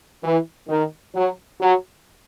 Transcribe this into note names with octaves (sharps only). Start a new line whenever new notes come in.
E3
D#3
F#3
F#3